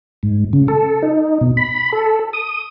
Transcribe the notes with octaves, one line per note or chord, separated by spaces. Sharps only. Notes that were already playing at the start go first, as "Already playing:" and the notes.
G#2
C#3
A4
D#4
B2
B5
A4
D#6